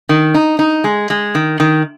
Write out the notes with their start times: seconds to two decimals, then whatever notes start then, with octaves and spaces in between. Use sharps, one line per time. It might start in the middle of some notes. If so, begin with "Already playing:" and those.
0.09 D#3
0.34 D#4
0.59 D#4
0.84 G#3
1.10 G#3
1.35 D#3
1.60 D#3